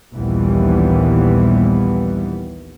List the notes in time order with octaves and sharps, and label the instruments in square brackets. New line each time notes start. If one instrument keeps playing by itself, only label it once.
[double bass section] A#1 D#2 E3 G3 B3